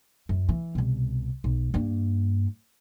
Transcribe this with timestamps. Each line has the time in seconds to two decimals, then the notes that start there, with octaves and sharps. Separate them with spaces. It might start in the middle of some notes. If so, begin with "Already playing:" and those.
0.29 F#2
0.49 E3
0.75 C2 B2
1.44 B1
1.74 G2 A#3